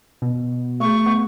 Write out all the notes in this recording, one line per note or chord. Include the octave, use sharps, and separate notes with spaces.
B2
A3 G#4 C#6
B3